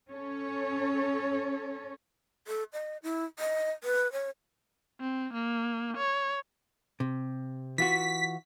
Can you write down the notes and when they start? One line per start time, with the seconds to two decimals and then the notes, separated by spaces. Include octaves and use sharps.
0.11 C#4 A4 C#5
2.47 A4
2.73 D#5
3.03 E4
3.39 D#5
3.84 B4
4.12 C#5
5.00 C4
5.34 A#3
5.97 C#5
7.00 C3
7.78 E3 F4 F#4 B6